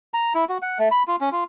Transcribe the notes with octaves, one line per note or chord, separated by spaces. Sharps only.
A#5
E4
F#4
F#5
A3
B5
F4
C#4
F4